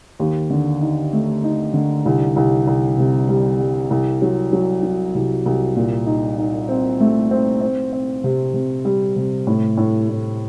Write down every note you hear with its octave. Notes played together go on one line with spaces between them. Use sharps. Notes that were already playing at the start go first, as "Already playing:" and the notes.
D#2
D3
D#4
A3
D#4
D3
C2
C2
C2
C3
G3
G3
C2
F#3
F#3
F#3
C2
C2
A#2
D#4
D#4
C4
A3
C4
C4
C4
C3
C3
G3
C3
A2
A2
A2